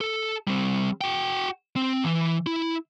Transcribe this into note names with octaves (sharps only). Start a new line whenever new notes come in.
A4
G3 C4
F#4 G5
C4
E3
E4